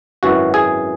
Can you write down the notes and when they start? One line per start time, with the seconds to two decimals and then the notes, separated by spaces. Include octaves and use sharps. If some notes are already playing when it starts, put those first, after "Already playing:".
0.23 G#1 F#2 E3 F#4
0.54 G#4